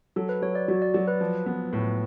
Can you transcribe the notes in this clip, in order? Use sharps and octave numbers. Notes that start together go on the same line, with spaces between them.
F#3 A4
B4
F#3 C#5
D5
F#3 F#4
D5
F#3 D5
B4
F3
B3
A2